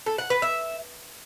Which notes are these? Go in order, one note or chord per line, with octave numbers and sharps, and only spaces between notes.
A4
F#5
B4
E5